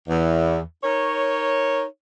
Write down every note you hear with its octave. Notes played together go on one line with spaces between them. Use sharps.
E2
D#4 A#4 C#5